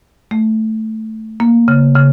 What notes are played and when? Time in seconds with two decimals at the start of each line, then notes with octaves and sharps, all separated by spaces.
0.31 A3
1.40 A#3
1.68 C#3
1.95 C#3